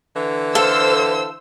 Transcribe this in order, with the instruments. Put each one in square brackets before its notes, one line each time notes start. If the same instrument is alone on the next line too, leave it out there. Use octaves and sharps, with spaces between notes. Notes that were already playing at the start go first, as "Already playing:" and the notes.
[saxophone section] D3 E3
[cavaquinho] A4 F5 [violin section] C5 E6